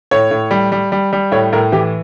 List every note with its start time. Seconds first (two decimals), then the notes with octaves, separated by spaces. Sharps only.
0.11 A2 C#5
0.31 A2
0.51 G3
0.72 G3
0.92 G3
1.13 G3
1.32 A2 C#5
1.52 A2 A#4
1.72 E3 G4